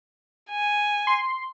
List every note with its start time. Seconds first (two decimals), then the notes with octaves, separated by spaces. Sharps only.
0.51 G#5
1.07 C6